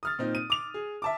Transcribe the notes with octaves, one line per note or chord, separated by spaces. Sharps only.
D#6 F6 A6
A#2 C4 D#4
D#7
D6 F7
G#4
E5 A5 D6